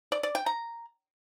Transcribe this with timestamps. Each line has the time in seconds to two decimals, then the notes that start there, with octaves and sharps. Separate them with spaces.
0.12 D5
0.23 D5
0.35 G5
0.46 A#5